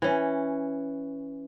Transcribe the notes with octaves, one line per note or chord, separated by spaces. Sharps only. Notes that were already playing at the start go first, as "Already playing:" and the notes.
E3 C#4